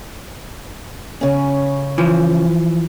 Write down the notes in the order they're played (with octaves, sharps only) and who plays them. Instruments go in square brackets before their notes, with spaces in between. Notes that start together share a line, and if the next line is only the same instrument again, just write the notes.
[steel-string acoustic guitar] C#3 C#4
[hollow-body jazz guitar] E3 F3